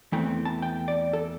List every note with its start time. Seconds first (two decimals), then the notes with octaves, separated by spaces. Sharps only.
0.12 E2 E3 A3 C4 G5
0.45 A5
0.62 G5
0.88 D5
1.13 A4